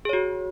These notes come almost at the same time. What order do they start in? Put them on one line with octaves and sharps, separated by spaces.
G#4 C#5 F#4